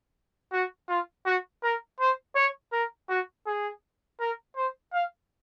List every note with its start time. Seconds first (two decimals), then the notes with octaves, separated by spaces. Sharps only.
0.52 F#4
0.89 F4
1.25 F#4
1.63 A#4
2.00 C5
2.35 C#5
2.72 A#4
3.09 F#4
3.47 G#4
4.20 A#4
4.56 C5
4.92 F5